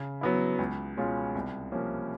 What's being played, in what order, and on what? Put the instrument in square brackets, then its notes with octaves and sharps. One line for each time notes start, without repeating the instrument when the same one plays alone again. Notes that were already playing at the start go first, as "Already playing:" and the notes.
Already playing: [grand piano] C#3
F#3 B3 E4
C#2
B2 G#3 C#4 F4
C2
C3 F3 A#3 C#4